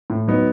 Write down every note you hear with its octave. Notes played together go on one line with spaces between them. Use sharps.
A2
F#3 B3 D#4